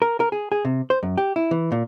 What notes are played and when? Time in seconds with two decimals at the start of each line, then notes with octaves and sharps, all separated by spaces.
0.02 A#4
0.20 A#4
0.32 G#4
0.52 G#4
0.65 C3
0.90 C5
1.03 F#2
1.18 G4
1.36 E4
1.51 E3
1.72 A#2